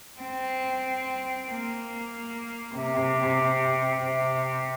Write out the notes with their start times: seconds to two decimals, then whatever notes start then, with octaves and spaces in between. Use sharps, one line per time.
0.21 C4
1.48 A#3
2.76 C3
4.04 C3